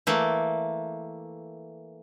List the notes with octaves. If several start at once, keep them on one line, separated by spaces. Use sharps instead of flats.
E3 A3 A#3